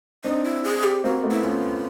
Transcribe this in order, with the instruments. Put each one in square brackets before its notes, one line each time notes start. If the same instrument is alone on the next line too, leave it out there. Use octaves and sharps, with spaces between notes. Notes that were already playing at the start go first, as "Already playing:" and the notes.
[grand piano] C4 D4 [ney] D#4
[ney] E4
G#4
G4
[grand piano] A#3 C4 [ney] F#4
[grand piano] A3 B3
[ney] E4
[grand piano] B3 C#4 [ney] F4